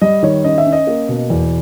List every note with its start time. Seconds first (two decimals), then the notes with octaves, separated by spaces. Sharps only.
0.02 G3 D#5
0.23 D#3 C#5
0.44 C#4 D#5
0.58 E5
0.66 C#4
0.72 D#5
0.87 A#3
1.09 B2
1.30 E2